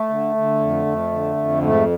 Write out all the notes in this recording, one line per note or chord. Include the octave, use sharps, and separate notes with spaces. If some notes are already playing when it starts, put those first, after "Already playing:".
Already playing: A3
D3
D3
F2
F2
D3
F2
G#2 A3